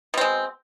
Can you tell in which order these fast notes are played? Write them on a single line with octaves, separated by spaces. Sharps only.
B2 C4 G#3